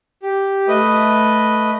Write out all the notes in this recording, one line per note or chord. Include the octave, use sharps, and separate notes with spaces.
G4
A3 B4 D#5